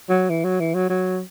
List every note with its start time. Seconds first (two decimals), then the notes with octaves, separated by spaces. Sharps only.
0.09 F#3
0.30 E3
0.45 F#3
0.60 E3
0.74 F#3
0.89 F#3